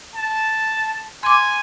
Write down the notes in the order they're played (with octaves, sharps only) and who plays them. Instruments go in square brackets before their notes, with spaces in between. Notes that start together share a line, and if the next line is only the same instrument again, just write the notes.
[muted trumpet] A5
[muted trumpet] G#5 [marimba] C6 D6